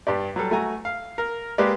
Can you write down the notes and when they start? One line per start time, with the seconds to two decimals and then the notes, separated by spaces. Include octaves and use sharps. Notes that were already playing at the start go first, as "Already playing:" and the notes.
0.07 G2 G4 D5
0.36 F#3 G3 A4
0.51 A3 F#4 G#5 A#5
0.85 F5
1.18 A#4
1.58 G#3 A#3 G4 B4 D5